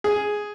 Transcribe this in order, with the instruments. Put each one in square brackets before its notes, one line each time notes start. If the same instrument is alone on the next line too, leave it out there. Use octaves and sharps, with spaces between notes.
[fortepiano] G#4